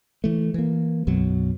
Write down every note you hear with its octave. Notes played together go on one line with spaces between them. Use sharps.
E3 A3
E3 A#3
B1 F#2 B2 F#3